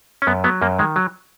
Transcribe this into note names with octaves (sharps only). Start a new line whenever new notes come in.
C#4
F#2 B3
F#3 B3
F#2 A#3
D#3 G#3
F#3